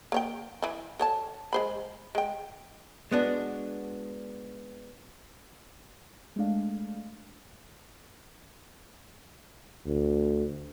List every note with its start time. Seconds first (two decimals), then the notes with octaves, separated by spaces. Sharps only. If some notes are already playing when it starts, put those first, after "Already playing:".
0.12 A#3 C#5 G5
0.62 E3 E4
0.99 A4 C#5 A5
1.53 G#3 C5 B5
2.15 G#3 G5
3.11 G#3 B3 D4 F#4
6.36 G#3 A3 D4 F5
9.86 D2